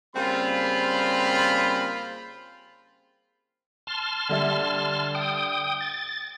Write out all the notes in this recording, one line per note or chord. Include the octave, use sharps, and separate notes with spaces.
C#3 G3 A#3 C4 F4 B5
A5 C6 F6
D3 G3 E5
G5 D#6
A6